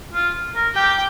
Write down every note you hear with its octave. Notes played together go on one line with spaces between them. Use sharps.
F4
A#4
G4 G5